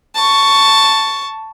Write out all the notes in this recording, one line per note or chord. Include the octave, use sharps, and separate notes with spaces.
A5 C#6